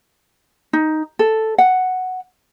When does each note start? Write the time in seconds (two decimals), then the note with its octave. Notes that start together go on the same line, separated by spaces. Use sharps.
0.73 D#4
1.19 A4
1.58 F#5